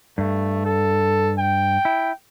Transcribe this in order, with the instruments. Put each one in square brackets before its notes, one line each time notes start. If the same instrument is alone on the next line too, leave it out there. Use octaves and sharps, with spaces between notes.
[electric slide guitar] G2 [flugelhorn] A3
[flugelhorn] A4
G5
[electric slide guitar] E4